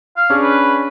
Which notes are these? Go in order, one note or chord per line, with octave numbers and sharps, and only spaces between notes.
F5
C#4 D4 G#4
B4